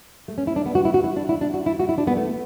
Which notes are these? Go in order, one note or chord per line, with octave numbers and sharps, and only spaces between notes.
A3
C#4
E4
D4
B3
F#4
E4
F#4
E4
D4
E4
D4
F#4
E4
F#4
E4
D4
B3
A3